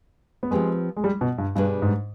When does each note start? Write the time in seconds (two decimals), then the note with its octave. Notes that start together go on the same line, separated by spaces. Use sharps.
0.43 B3
0.51 F3 G#3 C4 G4 B4
0.97 G#3
1.04 G3
1.21 B2
1.38 G2
1.55 G2 B2 G3 D4 G#4 B4
1.82 G#2